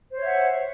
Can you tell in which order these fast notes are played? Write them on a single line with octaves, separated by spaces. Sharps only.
C5 C#5 E5 F#5